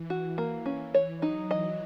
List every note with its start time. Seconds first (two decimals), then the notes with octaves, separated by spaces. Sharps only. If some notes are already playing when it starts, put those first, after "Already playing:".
Already playing: E3
0.10 F#4
0.38 A#3
0.66 C#4
0.94 C#5
1.22 F#3 D#4
1.50 E3 D#5